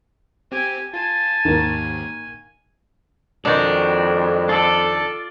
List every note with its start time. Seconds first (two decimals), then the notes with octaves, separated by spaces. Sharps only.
0.52 C4 G4 G#5
0.94 F4 G#5 A5
1.45 D#2 G#2 D#3 A#3
3.45 F2 D#3 G#3 D4 F#4
4.49 F4 A4 D5